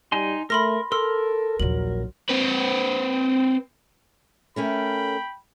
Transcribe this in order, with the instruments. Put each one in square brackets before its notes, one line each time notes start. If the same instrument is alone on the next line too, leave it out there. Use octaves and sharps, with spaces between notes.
[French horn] G3 [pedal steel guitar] D#4 G#5 C6
[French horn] A3 [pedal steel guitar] A#4 [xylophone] B5 C6 A#6
[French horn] A4 [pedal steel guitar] A#4 [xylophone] C6 E6
[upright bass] A#1 D#2 [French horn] F#3 [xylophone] F#7
[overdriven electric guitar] C4 B4
[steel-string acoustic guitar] A3 C#4 A#4 [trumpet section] G5 B5